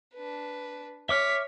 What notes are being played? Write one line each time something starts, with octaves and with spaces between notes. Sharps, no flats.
D4 B4
C#5 E5 D6 F6 B6